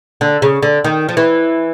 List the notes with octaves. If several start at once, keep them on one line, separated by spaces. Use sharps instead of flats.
D3
C#3
D3
D#3
F3
E3